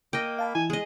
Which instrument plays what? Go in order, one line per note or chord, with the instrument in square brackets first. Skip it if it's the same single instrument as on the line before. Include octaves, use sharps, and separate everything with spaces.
[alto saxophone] A#3 [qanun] D#5 G5
[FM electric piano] F5 A5 B5
[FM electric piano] E3 E4 [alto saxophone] G#5
[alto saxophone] G#3 [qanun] G#4 D#5